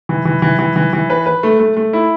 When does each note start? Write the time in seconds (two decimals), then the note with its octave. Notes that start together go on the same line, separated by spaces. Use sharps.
0.09 E3
0.25 E3
0.42 E3
0.59 E3
0.76 E3
0.93 E3
1.10 B4
1.26 B4
1.43 A3
1.59 A3
1.77 A3
1.93 E4